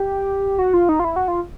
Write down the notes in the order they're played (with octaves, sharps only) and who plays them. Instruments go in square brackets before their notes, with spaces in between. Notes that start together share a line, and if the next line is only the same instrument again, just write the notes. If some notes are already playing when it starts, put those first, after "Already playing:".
Already playing: [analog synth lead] G4
F#4
F4
D#4
F4
E4
F#4
F4